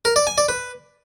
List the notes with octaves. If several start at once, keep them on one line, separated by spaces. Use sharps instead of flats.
A#4
D5
G#5
D5
B4